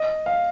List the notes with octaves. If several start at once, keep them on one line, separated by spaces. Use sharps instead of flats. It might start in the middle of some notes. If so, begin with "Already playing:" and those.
Already playing: D#5
F5